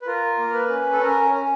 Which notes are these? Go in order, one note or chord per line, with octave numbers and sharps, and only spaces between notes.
B4
F4 A#4
A#3
B4
C#4
A4
C#4 A#4
C#4